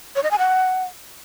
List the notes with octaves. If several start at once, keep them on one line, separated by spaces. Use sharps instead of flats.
C#5
D#5
G#5
F#5